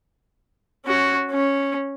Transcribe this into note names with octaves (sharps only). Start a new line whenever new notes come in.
C#4 F#4
C#4